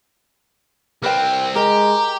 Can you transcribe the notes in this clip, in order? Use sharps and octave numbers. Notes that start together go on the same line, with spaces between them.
C2 C4 A#4 B4 G5
G#3 G4 A#4 A#5